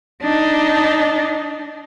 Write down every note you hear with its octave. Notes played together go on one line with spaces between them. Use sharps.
D4 D#4